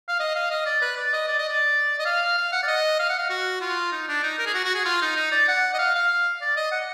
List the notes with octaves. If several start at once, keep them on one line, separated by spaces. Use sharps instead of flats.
F5
D#5
F5
D#5
D5
B4
D5
D#5
D5
D#5
D5
D#5
F5
F5
F#5
D5
D#5
F5
F#5
F5
F#4
F4
D#4
D4
D#4
A#4
G#4
F#4
F#4
G#4
F4
D#4
D#4
D5
F#5
D#5
F5
F5
D5
D#5
F#5